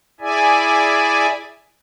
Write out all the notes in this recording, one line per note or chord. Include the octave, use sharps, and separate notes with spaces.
E4 G#4 D5 E5 G#5